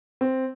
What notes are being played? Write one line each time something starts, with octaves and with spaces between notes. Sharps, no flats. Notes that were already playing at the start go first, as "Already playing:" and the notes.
C4